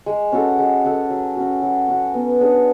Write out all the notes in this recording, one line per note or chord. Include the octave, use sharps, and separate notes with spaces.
G#3
C#4 F#4 A4
G#3
C#4 F#4 A4
F#3
C#4 F#4
F#3
C#4 F#4
B3
D4 G#4 C#5